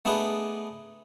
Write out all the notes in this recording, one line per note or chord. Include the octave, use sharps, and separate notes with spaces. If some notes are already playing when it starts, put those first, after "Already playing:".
A3 B3 D4 D#4 G#4 B4